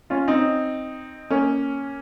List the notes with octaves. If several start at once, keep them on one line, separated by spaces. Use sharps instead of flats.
C#4 F4
C4 D#4
A#3 C#4